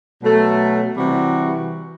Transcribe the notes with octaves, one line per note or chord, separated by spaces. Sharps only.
B2 F#3 A3
C3 E3 G3 C4 F#4